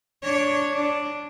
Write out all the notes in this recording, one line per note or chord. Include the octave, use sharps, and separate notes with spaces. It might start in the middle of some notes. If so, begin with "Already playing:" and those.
D4 C#5
D4